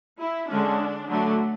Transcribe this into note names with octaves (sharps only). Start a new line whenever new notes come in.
E4
D3 G#3 C#4 D4
D3 F#3 A3 D4